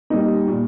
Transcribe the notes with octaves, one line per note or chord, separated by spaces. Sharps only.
G3 A#3 D#4
A#2